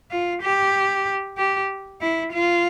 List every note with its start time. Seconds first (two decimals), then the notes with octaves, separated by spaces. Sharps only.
0.11 F4
0.43 G4
1.38 G4
2.01 E4
2.33 F4